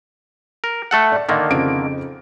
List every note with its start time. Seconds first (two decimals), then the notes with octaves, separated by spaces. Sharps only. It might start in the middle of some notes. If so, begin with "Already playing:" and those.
0.64 A#4
0.91 A3 A4 F#5
1.12 D5
1.29 D3 D#3 A#3 D5 D#5
1.50 F2 C#3 D7